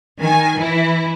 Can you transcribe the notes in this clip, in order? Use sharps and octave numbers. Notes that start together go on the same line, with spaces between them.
D#3 G#5
E3 E4